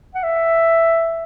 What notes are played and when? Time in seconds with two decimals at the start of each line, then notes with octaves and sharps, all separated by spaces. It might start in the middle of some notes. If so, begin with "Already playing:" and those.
0.15 F#5
0.23 E5